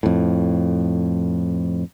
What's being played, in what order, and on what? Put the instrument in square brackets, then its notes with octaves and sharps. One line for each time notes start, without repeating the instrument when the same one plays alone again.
[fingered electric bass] F2 A2